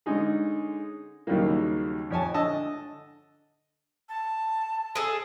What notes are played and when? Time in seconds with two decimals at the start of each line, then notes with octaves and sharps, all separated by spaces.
0.06 D3 G#3 C#4 D#4 G#4
1.27 D#2 C#3 F#3 G3 A#3
2.11 F2 C#5 G#5 A5
2.34 D3 D#5 A5 E6
4.09 A5
4.95 G#4 A4